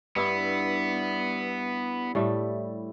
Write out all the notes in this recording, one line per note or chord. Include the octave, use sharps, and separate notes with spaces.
G2 B3 E4
A2 G3 A3